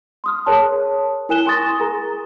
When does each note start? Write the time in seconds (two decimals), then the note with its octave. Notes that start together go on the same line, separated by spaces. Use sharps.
0.24 C6 D#6 F6
0.46 G#4 A#4 C#5 A5
1.29 E4 A#4 G#5 F#6 E7 G7
1.46 G#5 C6 C#6 D#6 A6 A#6
1.80 G#4 A#4 A#5